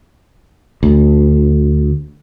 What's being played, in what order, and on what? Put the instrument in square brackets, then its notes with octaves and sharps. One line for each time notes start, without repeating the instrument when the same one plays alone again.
[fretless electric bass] D2